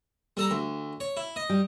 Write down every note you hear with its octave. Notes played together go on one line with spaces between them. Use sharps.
G3 A4 A#5
D2
C#5
E4
D#5
G3